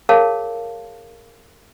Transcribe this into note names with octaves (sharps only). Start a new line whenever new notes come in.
G#4 A#4 C#5 F5 A5